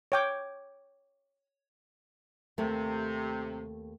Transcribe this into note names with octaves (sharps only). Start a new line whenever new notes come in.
C#5 G5 D6
D#2 C3 A3 C4